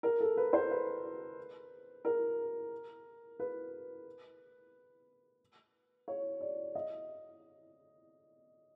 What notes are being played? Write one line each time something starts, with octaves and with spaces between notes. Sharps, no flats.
A#4
A4
B4
C5
B4
A#4
B4
C#5
D5
D#5